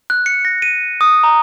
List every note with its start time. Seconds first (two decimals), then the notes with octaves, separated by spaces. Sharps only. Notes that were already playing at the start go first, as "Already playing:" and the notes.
0.10 F#6
0.26 C#7
0.45 A#6
0.62 D#7
1.01 D#6
1.24 A#5